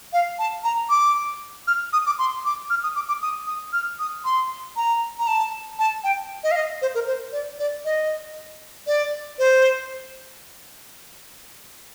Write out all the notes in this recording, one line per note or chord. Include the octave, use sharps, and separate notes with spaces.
F5
A5
A#5
D6
F6
D#6
D6
C6
D6
F6
D#6
D6
D6
D#6
D#6
F6
D#6
C6
A#5
A#5
A5
A5
G5
D#5
F5
D#5
C5
A#4
C5
D5
D5
D#5
D5
C5